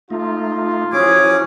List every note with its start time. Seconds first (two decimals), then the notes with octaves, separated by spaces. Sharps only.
0.10 A3 D#4 F4
0.93 F3 C#4 E4 F#4 G#4 D6